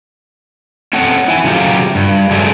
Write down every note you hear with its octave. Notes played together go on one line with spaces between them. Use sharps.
C4 C#4 A4 F#5
E4 G#5
C#3 F#3 A3 F4 G4
G2
C#3 F#3 G#3 A3 D4